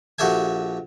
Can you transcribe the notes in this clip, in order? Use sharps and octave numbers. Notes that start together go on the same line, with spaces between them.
A#1 F#4 G4 A4 E5 G#5